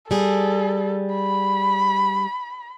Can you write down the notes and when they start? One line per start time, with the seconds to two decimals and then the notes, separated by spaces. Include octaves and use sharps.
0.11 G3 G#4 A4
1.14 B5